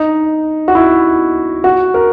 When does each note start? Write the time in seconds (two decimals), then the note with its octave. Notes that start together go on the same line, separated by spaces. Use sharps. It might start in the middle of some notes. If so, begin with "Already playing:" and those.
Already playing: D#4
0.68 F#4
0.75 E4
1.64 F#4
1.94 A#4